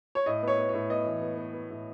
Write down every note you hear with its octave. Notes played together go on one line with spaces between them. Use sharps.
C#5
A2 D#5
B3 C#5
B3
A2 C#5
B3 D#5
E3
B3
B3
B3
A2